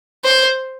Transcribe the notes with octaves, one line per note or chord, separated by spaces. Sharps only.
C5